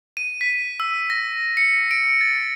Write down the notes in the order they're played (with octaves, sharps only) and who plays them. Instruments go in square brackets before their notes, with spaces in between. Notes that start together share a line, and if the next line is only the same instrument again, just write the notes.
[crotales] D#7
B6
E6
A#6
C#7
D7
A6